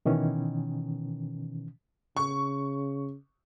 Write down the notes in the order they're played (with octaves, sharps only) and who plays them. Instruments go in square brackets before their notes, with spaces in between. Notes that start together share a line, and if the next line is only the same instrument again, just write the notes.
[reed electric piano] B2 D#3 E3 C#4
[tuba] C#3 [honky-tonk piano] C#6